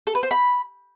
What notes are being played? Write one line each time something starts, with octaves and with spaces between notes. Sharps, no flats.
A4
B4
C5
B5